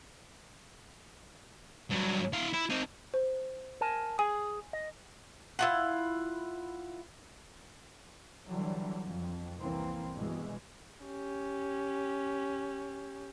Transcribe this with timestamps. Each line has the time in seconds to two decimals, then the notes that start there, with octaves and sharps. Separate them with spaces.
1.90 G2 F#3
2.33 E4 F5
2.54 E4
2.70 C4 D#4
3.14 C5
3.81 A#4 G#5 A5
4.19 G#4 G#5
4.73 D#5
5.59 E4 F4 F#5
8.48 D3 E3 F#3 G3
9.07 F2
9.58 C2 E3 A#3 C4
10.12 G2 B2 E3 G#3
11.04 C#4 G4